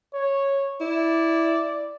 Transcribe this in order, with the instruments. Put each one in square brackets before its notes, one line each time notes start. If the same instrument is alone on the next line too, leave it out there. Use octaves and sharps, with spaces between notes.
[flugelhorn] C#5
[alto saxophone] E4 [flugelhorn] D5